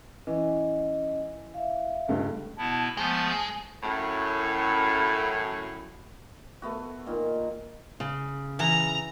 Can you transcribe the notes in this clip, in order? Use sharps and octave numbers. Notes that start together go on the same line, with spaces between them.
E3 C#4 D#5
E5 F5
C#2 G2 A3
B2 B3 E4 A5
F3 G#3 A3 B3 A5
F#2 A2
A3 B3 F#4
A#2 D#3
C#3
E3 A#5